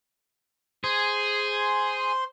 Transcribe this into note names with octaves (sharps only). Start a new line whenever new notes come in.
G#4 C5 C6